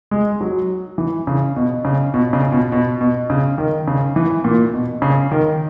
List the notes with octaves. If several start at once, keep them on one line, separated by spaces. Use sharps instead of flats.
G#3
F#3
E3
C#3
B2
C#3
B2
C#3
B2
B2
B2
C#3
D#3
C#3
E3
A#2
B2
C#3
D#3